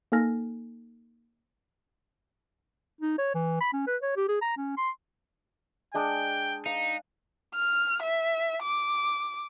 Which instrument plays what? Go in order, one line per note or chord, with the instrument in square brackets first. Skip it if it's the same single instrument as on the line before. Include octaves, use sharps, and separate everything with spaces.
[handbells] A#3 D#4 A4 G#5 F6 A#6
[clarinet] D#4
C#5
E3
B5
C#4
B4
C#5
G4
G#4
A#5
C#4
C6
[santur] G#3 D4 D#6 [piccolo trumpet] G5
[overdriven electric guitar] D#4 [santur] F5
[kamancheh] F6
E5
D6